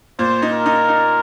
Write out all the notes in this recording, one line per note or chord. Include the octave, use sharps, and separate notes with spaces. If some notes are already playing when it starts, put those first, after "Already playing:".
A#2 C5
D#4
A#4
D#4
D#4